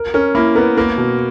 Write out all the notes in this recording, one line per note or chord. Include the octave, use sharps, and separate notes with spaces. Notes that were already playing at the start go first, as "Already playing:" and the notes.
Already playing: A#4
C#4 A#4
A#3 E4
B3 A#4
A#3 A#4
B2